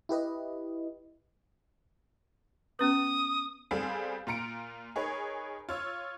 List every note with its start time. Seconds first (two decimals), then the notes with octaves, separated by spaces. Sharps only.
0.09 E4 G4 B4 D#5
2.79 B3 C#4 B4 D#6
3.71 G3 B3 C4 G#4 A4 F5
4.27 A#2 F4 A#5 C#7 D7
4.96 D#4 G#4 A#4 B4 C#5
5.69 F4 C#5 E6